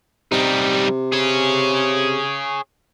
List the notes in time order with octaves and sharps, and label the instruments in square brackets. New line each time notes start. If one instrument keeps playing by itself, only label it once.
[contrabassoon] C3 [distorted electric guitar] G3 D#4
[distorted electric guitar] G#4 C#5